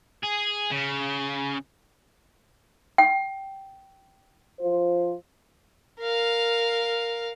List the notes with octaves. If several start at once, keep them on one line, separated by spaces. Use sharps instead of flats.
G#4
C#3
G5
F3 F4 C5
A#4 F5